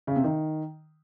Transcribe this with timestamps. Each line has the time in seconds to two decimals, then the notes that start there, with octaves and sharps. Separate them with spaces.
0.07 C#3
0.16 C3
0.24 D#3